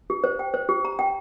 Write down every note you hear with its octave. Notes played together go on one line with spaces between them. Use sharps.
G4
C5
G5
C5
G4
A#5
G5